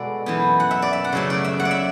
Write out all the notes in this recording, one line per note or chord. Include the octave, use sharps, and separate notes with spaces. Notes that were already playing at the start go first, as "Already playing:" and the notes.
Already playing: B2 G#3 B3 F#4 A4 D5
F#2 E3 B3
F#5
E5
D5
E5
F#5
C#3 F#3 A3 E5
D5
E5
F#5
D5
E5